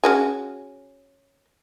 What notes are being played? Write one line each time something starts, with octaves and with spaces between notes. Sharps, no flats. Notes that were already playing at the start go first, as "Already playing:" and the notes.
C#4 F#4 G#4